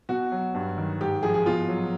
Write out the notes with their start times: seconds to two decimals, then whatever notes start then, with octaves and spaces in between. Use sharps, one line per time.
0.09 B2 F#4
0.32 F#3
0.54 G2
0.78 D#3
1.00 G#2 G4
1.23 F3 G#4
1.34 G#4
1.46 B2 F4
1.69 F#3